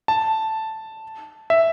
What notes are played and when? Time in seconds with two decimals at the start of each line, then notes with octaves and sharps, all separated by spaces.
0.08 A5
1.50 E5